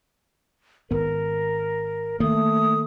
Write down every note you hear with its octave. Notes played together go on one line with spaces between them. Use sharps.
G#1 B3 A#4
D#3 A3 A#3 D#6